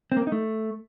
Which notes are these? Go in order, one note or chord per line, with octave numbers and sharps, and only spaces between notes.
C4
A#3
C4
D#4
A3